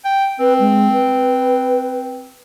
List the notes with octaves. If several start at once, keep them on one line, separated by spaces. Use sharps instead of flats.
G5
C4 B4
G#3
B4